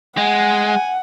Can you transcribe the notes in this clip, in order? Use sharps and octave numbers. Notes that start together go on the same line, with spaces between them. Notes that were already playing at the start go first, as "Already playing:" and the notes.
G#3 F#5 G#5